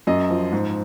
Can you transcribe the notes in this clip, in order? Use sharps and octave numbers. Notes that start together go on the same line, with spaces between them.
F#2 D#5
F3
G#2